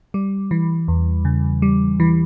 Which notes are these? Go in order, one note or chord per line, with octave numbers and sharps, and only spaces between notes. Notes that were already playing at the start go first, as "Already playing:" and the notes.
G3
E3
E2
C#3
G3
E3